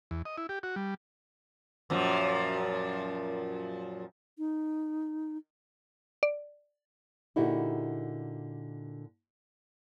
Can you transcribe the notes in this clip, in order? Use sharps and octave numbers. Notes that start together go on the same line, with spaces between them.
E2
D#5
E4
G4
F#4
G3
F#2 A#2 F3
D#4
D5
A#2 D3 D#4 E4 F#4 G4